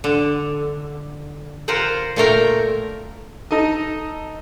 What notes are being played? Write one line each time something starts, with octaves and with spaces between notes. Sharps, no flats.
D3
F4 A#4 C5 F#5 G5
A#2 A3 A#4 G5
D#4 A4 D#5